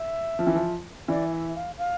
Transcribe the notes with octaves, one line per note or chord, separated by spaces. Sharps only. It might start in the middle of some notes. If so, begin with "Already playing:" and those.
Already playing: E5
F3
E3
F3
E3 D5
E5
F5
F5